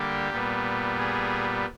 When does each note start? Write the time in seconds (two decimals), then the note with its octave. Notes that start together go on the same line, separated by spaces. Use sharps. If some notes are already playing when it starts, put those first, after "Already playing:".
Already playing: D3 G3 A#3 G4
0.30 A#2 G3 B3
0.98 G#4